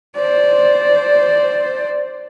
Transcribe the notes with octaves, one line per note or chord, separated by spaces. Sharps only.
C5 D5